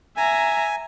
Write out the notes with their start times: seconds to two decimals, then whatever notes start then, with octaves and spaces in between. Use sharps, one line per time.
0.17 E5 G#5 A#5